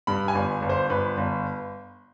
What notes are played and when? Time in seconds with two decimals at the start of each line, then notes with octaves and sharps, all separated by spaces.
0.07 G2 B5
0.28 G#5
0.35 G1
0.62 G1
0.69 C5
0.90 G1 B4
1.18 G1